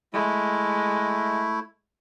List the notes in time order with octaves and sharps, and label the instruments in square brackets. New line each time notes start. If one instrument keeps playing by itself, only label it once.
[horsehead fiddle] G#3 [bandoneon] A3 E4